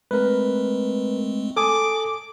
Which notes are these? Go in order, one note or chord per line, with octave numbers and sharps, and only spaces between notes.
G#3 A3 C4 A#4 B4
A4 G#5 D6 D#6